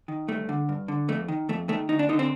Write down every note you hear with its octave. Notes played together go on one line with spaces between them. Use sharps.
D#3
G2 A3
D3
G2
D3
F2 A3
D#3
F2 A3
D#3 A3
D2 D#4
D4
D3 D#4
C4